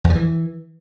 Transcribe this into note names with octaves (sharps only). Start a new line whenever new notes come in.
E2
F3
E3